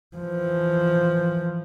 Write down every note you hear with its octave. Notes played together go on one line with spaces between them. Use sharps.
E3 F3